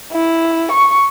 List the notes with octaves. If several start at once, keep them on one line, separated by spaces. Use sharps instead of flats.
E4
C#6